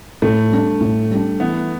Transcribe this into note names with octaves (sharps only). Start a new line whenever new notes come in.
A2 A3
G3 D4
A2
G3 D4
E3 B3